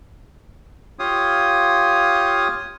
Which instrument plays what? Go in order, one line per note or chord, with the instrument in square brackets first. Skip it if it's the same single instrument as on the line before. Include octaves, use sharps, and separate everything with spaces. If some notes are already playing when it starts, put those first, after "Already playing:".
[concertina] F4 G4 C#5 F5 D#6